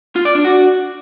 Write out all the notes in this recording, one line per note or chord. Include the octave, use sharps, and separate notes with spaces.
F4
D5
D4
F#4